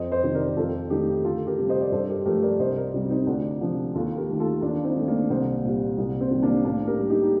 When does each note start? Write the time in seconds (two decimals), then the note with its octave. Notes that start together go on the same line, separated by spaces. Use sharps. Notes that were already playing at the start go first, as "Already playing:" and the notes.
Already playing: F2 C5 D#5
0.11 C5 D#5
0.24 C3 D#3
0.35 A#4 D5
0.57 F2 F4 A4
0.90 D#3 A3 D#4 G4
1.24 D2 F4 A4
1.47 G4 A#4
1.58 C3 G3
1.69 C5 D#5
1.81 D5
1.92 G2 A4 C5
2.09 G4 A#4
2.26 F3 A3 G4 A#4
2.42 A#4 D5
2.59 C2 C5 D#5
2.77 A#4 D5
2.94 C3 G3
3.10 C4 D#4
3.27 D2 D4 F4
3.61 C3 F3
3.95 D#2 F4 A4
4.17 G4 A#4
4.29 D#3 A3
4.39 F4 A4
4.62 D#2 D4 F4
4.84 C4 D#4
4.96 D#3 A3
5.08 A#3 D4
5.30 C2 C4
5.64 A#2 G3
5.97 C2 A#3
6.21 C4
6.31 C3 D#3 G3
6.43 A#3 D4
6.65 A2 A#3 D4
6.87 G4 A#4
6.98 G3
7.10 D#4 G4
7.23 D#4